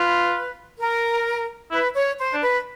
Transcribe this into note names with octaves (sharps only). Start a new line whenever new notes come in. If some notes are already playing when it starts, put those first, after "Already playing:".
Already playing: F4 B4
A#4
E4 B4
C#5
C5
D4
B4